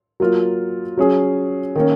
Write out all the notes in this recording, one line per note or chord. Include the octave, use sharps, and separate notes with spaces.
F#3 A#3 F4
F#3 C#4 G#4
D#3 A#3 C#4